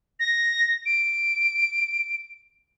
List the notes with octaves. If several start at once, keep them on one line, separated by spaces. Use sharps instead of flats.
A#6
D7